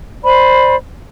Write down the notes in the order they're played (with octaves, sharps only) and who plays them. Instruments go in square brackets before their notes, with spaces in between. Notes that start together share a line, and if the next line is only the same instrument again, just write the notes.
[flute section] C5 D5 B5